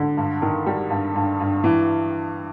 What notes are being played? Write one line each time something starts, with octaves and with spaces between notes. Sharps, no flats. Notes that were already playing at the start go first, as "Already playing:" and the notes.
Already playing: D3
G2
D#3
G3
G2
G2
G2
E3